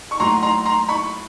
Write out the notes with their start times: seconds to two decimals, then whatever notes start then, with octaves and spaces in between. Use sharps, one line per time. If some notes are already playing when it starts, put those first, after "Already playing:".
0.11 C#6
0.20 A2 F#3 A#5 C6
0.43 A#5 C6
0.66 A#5 C6
0.89 B5 C#6